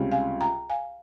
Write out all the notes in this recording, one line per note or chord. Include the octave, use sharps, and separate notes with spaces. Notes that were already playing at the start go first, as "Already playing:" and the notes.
Already playing: C#2 C3 G3 C#4 F4
F5 G#5
G5 A#5
F5 G#5